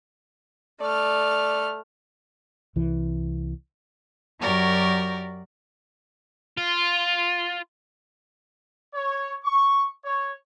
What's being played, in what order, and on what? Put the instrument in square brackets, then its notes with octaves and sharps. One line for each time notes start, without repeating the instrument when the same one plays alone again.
[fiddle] A3 F6 [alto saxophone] D5
[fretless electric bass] C2 E3
[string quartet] F#2 F#4 G4 A#4 D5
[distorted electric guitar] F4
[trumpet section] C#5
C#6
C#5